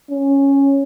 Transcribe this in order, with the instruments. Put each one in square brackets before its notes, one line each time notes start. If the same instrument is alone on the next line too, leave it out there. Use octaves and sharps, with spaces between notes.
[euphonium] C#4